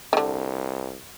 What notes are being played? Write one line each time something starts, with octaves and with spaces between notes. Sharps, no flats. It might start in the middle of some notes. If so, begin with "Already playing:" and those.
C2 D3 D#3